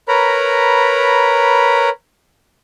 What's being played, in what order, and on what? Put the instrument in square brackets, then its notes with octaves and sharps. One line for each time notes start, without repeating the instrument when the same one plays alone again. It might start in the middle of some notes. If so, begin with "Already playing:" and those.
[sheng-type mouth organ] A#4 B4 C#5 A#5 B5